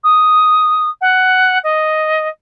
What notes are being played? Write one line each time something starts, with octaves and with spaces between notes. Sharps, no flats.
D#6
F#5
D#5